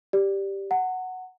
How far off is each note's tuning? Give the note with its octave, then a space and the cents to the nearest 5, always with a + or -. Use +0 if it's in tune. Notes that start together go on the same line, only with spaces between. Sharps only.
G4 +0 D5 +0
F#5 +0 A#5 -45